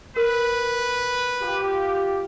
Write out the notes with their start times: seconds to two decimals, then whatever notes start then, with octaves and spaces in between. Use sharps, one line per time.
0.16 A#4 B4
1.42 F4 G4